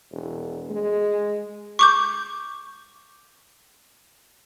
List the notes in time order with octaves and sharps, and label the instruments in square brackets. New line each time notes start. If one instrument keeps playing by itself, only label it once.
[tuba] E1
G#3
[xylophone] C#6 D6 G6